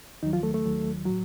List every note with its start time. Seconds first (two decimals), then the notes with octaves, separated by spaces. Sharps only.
0.23 D#2 D#3 F#3 D#4
0.33 F3 F4
0.43 A3 A4
0.54 A3 A4
0.65 D#2 D#3 F#3
1.06 A2 F#3 F#4